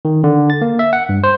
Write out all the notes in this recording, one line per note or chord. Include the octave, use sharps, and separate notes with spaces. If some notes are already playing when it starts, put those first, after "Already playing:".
D#3
D3
A6
A#3
E5
F#5
G2
C5